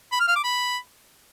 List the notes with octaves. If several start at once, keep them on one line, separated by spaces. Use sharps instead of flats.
B5
F6
F5
D6
B5